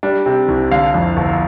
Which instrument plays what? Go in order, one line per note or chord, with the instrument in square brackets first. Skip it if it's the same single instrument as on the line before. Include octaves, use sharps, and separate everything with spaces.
[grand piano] G3 D4
C3
C2
D3 F5
F2
G1